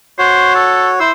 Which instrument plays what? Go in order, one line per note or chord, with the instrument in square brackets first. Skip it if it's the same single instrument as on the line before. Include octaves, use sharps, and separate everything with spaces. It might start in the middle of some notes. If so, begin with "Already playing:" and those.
[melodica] F#4 C#5 [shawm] C5
[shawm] A4
[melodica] E4 E6 [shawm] C5